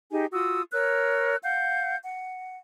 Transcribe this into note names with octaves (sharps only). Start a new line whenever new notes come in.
D#4 G4 G#4 G#5
F4 F#4 D#6 E6
A#4 C#5 E6 F#6
F5 F#5 G6
F#5